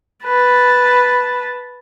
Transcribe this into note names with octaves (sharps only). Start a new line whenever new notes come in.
B4 A5